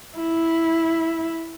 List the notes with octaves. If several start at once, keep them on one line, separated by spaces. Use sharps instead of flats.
E4